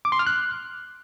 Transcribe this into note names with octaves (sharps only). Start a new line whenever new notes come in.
D6
C6
F6
F#6